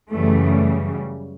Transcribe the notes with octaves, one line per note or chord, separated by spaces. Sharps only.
F#2 C#3 E3 G3 A3